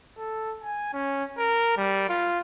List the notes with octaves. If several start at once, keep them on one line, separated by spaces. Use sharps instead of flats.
A4
G#5
C#4
A#4
G3
F4